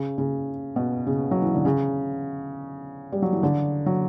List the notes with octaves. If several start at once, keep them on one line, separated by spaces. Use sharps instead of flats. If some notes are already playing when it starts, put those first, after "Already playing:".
Already playing: C#3
C#3
B2
C#3
F#3
E3
D3
C#3
G3
F#3
E3
D3
F#3